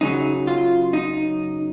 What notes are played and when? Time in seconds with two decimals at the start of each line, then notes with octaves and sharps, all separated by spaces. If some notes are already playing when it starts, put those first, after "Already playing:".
0.01 F#2 C#3 F#3 D#4
0.47 F4
0.93 D#4